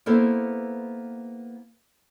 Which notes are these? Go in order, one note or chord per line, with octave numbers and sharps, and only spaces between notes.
A#3 B3 E4 A4 C5